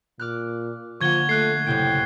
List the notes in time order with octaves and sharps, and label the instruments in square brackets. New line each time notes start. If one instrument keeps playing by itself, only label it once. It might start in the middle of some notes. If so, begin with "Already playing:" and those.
[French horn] A#2 [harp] D6 F6 F#6
[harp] D3 A#3 F#5 [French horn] F3 [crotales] C#6 G#6 G7
[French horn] A3 [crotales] F#6 C7
[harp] F#1 C3 G5 [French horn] A2